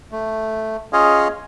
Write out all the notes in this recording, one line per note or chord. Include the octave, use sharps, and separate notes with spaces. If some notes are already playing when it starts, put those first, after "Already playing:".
A3
C#4 F4 G#4 C#5 D#5 F5